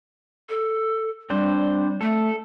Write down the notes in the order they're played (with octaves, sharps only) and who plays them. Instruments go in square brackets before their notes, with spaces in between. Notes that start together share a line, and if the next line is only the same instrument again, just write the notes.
[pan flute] A4
[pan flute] G3 [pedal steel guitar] C4 D4 C5
[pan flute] A3 [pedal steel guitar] A4